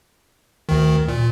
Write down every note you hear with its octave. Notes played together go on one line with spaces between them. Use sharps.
D2 D#3
A#2